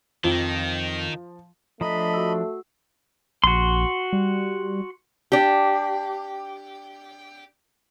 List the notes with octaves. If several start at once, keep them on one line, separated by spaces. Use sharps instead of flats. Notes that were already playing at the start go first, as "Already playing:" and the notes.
F2 D#3 F3
F3 A3 D4 D#5 A#5 B5 B6
F#4 E6
A#1 F#4 C6
G3
D4 G4